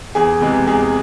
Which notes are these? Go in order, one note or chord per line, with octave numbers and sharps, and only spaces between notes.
E2 G#4
C3 E3 G#3
E2 G#4